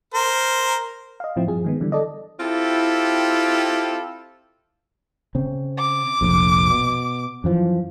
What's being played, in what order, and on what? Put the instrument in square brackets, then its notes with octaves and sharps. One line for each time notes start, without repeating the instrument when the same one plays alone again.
[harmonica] A#4 C5
[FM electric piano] D#5 F5
A2 F3 C4 E4
G2 F3 G#4
D#3 G#3 B3
D3 E3 G3
A4 D5 D#5
[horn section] C4 E4 F4 G4 A4
[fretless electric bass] C#3 C4
[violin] D6
[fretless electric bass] F1 A#1 F2
B2
F#2 E3 F3